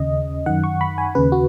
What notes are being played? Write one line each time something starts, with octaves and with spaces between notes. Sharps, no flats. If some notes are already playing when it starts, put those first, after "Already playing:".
Already playing: D#2 C#3 D#5
F#2 D#3 F#5
C#6
B5
G#5
D#2 C#3 B4
F#4